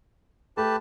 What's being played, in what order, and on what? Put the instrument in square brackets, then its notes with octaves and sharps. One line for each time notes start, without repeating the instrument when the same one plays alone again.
[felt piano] A3 [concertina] G4 B4 A5